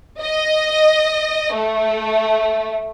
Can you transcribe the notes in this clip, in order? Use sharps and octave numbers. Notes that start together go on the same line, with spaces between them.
D#5
A3